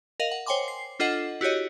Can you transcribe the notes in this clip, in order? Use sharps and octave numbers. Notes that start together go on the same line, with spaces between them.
A#4 D#5 F5 F#7
F#5
C5 C#5 G5 G#5 C6 D6
C7
D4 F4 A4 D#5 F#5 C7
E4 F#4 G4 C#5 D#5